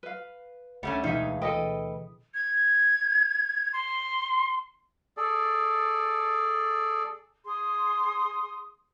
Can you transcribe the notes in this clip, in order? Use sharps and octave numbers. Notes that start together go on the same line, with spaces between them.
B4 F5
D2 G3 A3 C#4 F#5
E1 D#4 G#4 E5 F5
A4 B4 D#5 G5 D#6
G#6
C6
G#4 A4 D5
G#4 C6 D#6